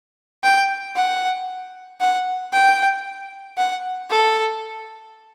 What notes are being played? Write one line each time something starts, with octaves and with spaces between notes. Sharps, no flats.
G5
F#5
F#5
G5
F#5
A4